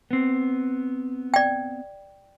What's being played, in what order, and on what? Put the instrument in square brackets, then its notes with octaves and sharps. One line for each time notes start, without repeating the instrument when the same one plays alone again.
[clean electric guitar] B3 C4
[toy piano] D5 G5